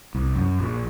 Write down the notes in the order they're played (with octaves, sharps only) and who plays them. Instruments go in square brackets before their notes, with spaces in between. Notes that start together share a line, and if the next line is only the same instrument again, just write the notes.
[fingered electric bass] C2
F#2
A#1